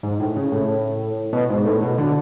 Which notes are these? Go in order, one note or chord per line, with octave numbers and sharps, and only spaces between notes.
G#2
A2
C#3
A2
B2
G#2
A2
B2
D3